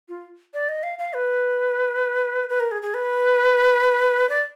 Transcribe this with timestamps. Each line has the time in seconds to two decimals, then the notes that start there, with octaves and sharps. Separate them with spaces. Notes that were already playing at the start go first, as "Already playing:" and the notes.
0.09 F4
0.54 D5
0.69 D#5
0.83 F5
0.99 F5
1.14 B4
2.49 B4
2.60 A#4
2.71 G#4
2.82 G#4
2.94 B4
4.29 D5